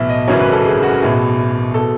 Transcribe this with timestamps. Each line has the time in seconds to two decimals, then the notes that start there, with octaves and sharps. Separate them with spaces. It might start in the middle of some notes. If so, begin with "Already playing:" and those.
Already playing: B1 A2 E3 E5
0.09 D#5
0.28 G#1 F#2 C#3 E3 C#5
0.40 B4
0.53 A4
0.65 G#4
0.83 F#4
1.00 B1 A2 E3 G#4
1.74 B2 A4